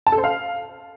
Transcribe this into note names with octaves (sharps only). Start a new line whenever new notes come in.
A5
A4
C5
F5